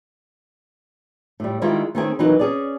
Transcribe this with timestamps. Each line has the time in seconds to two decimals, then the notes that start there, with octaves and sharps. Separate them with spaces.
1.40 A2 G3
1.62 D#3 G3 G#3 E4 F4
1.95 D#3 A3 C4 C#4 G#4 G#5
2.19 E3 F#3 D#4 A#4 B4
2.40 C#4 G#4 D5